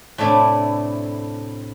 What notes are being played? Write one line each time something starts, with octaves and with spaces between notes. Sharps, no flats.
A2 C3 A3 D4 E4